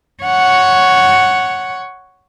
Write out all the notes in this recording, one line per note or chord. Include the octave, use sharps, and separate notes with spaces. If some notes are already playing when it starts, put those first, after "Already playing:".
C#5 F#5